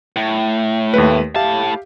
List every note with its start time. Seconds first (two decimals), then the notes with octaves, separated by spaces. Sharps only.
0.16 A2
0.94 D#2 A3 B4
1.36 A2 G4 E5 F5 A5